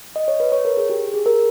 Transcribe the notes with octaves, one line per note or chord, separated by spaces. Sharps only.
D#5
C#5
B4
C#5
A#4
G#4
G4
G#4
A#4